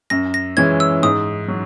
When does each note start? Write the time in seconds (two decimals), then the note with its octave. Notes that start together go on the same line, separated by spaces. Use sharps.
0.10 F#2 A#6
0.34 A#6
0.57 E3 G#3 C#4 G#6
0.80 E6
1.03 G#2 D#6
1.48 F#3